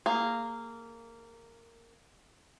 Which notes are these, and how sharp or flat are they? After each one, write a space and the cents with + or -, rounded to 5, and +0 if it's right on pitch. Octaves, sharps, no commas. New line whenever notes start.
A#3 -15 G#4 +0